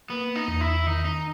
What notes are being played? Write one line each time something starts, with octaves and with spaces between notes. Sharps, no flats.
A#3 B3
D#4
E2
E4
D#3 D#4
D#4